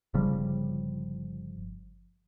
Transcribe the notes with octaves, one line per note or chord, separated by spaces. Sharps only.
G1 C#3 F3 G3